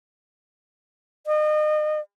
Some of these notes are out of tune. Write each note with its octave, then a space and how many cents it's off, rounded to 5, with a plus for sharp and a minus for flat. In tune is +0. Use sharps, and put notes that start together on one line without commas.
D#5 -35